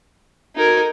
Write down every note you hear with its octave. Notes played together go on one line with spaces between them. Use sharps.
D#4 F#4 A4 A#4 G#6